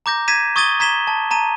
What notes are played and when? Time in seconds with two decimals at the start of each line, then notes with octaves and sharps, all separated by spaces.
0.06 A#5 D6 G6 A#6
0.28 G#6 A#6 B6 D#7 E7
0.56 C#6 D#6 G#6 A6 D#7 G7
0.80 A#5 G#6 B6 E7 G7
1.07 A5
1.31 A5 A#5 D#7